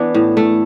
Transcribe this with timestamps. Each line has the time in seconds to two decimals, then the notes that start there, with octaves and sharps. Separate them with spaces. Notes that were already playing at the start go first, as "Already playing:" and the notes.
Already playing: E3 B3 D4
0.14 A2
0.37 A3